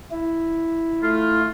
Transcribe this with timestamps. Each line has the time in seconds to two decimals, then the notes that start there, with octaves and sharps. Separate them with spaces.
0.11 E4
1.02 A3 F4